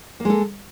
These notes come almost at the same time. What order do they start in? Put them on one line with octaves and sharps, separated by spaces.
A#3 G#3 A4